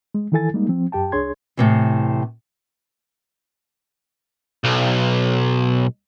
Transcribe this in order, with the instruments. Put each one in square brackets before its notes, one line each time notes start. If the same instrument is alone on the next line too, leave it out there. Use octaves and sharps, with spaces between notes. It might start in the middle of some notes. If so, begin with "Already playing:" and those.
[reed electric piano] G#3
D#3 E3 E4 A4 G#5 A6
G3 G#3 A#3 D#4
F3 C4
F#2 G4 G5 A5
C2 D4 G#4 C#5 C6 G#6
[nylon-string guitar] A2 C3 E3
[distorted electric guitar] B1